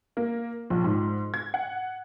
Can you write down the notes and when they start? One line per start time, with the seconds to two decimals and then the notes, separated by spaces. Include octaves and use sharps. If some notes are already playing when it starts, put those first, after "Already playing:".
0.17 A#3
0.70 A#1
0.84 G#2
1.34 G#6
1.54 F#5